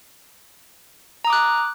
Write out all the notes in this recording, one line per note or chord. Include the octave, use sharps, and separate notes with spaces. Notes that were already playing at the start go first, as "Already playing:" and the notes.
A#5 D6 D#6 F#6